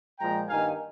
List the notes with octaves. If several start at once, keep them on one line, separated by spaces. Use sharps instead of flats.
A#2 F3 G#3 G5 A#5
G2 D#3 A#3 D#4 F5 G#5